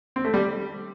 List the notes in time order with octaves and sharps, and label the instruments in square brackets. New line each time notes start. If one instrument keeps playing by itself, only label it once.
[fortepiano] C4
A3
G3